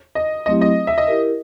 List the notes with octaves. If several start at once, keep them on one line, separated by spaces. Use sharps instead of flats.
D#5
F#3 A3 C4 E4 G4 D#5
D#5
E5
D#5
E4 G4 A#4